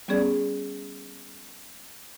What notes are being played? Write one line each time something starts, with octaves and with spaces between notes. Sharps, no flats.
G3 B3 C#4 G#4 D5